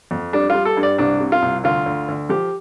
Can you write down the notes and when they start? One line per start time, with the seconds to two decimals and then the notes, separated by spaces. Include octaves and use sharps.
0.11 F2
0.33 G3 D4
0.50 G3 F4
0.65 A4
0.77 G2
0.83 D5
0.98 C2 D4
1.20 C3
1.32 F4
1.42 C2
1.64 D2 F4
1.86 D2
2.08 D2
2.29 F3 G4